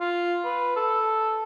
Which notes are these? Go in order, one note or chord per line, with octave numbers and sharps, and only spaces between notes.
F4
B4
A4